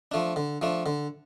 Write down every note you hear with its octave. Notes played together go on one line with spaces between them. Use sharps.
F3 A3 D4
D3
F3 A3 D4
D3